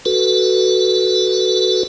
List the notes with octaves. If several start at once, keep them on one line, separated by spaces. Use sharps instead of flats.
F#4 A4 B4